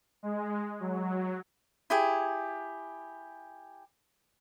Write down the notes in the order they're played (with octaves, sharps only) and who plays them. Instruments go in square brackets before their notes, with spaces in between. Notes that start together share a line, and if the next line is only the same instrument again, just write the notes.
[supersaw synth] G#3
F#3
[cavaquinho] E4 G4 G#4